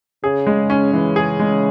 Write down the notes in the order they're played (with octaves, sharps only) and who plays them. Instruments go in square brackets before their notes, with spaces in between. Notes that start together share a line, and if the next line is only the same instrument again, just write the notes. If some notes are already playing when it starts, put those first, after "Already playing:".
[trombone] C#3 [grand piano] G#4
[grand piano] G#3
C#4
[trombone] C#3 [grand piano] E3
[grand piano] G#4
G#3